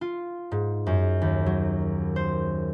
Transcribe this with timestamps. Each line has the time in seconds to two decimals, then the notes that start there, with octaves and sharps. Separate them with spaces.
0.01 F4
0.51 G#2
0.86 F#2
1.22 D#2
1.46 F#3
2.16 C5